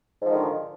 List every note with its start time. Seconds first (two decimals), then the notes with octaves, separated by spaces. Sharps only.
0.21 G#2
0.26 F3
0.30 D#3
0.34 D3